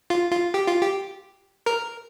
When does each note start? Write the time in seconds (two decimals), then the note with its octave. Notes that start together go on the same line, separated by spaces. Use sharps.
0.10 F4
0.32 F4
0.54 G4
0.68 F4
0.81 G4
1.66 A#4